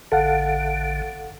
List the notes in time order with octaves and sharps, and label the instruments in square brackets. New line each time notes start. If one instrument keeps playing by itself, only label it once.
[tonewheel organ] A1 D3 [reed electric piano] A4 F5 F#5